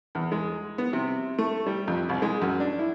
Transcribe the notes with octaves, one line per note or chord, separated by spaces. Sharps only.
E2
G#3
B3
C3
A3
G3
F2
C2
G#3
F#2
D4
E4